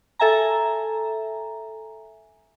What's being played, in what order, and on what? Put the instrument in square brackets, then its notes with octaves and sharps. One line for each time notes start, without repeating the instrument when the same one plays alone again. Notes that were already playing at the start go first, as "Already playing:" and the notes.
[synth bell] A4 E5 G#5 A#5